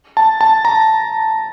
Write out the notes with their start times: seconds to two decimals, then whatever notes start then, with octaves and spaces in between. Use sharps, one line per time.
0.17 A5
0.41 A5
0.65 A#5